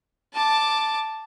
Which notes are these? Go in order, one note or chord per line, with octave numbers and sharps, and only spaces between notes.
A5 D6